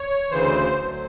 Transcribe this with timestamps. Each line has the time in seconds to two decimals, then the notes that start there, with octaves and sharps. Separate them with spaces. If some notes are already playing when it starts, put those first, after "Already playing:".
Already playing: C#5
0.30 D2 C#3 E3 C5
0.78 D2 D3 F#3